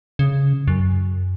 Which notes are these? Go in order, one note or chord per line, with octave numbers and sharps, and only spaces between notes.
C#3
F#2